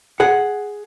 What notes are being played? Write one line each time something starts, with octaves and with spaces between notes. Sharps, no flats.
G#4 F#5